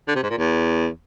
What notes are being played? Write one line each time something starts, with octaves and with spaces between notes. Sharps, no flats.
D3
C3
G#2
A#2
E2